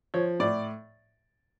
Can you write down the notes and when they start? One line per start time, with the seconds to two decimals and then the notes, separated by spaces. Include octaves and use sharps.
0.14 F3 C#5
0.40 A2 D5